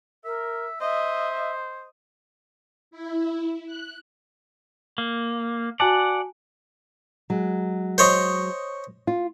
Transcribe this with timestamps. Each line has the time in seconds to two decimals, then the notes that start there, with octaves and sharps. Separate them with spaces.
0.25 A#4 E5
0.81 C5 D#5 E5
2.91 E4
3.66 F#6
4.98 A#3
5.80 F#4 D5 F#5 G#5 A5
7.30 F#3 G#3
7.98 C5 C#5 D#5
9.07 F4